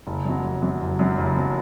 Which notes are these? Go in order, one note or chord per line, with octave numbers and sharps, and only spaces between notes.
F#1
F#2 F#3
F#1
F#2 F#3
F#1
F#2 F#3
F#1
F#2 F#3